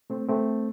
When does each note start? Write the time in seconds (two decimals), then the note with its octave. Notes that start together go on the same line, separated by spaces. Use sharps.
0.10 A3 C4
0.28 A3 C4